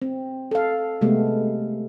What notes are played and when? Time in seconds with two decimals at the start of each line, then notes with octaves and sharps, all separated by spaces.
0.02 C4
0.51 A4 F5
1.01 C3 G#3 A3 B3